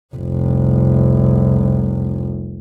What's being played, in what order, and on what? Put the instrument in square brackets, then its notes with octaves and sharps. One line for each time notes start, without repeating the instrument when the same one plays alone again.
[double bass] F1 C2